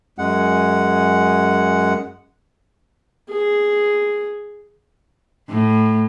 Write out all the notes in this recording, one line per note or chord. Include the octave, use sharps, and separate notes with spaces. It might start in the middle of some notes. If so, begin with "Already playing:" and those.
F#2 G#3 F#5
G#4
A2